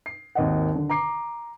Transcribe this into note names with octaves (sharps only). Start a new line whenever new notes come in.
C7
G#1 D#2 D#5 F#5
D3
A#5 D6 C7